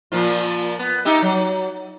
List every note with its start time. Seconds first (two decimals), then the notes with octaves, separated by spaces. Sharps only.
0.12 A#2 F3 F4
0.79 B3
1.05 D#4 G4 E5
1.22 F#3